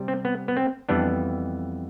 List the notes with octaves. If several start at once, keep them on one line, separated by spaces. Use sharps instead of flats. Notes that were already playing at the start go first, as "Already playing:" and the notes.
Already playing: C3 G3
C4
B3
B3
C4
F2 E3 G3 B3 D4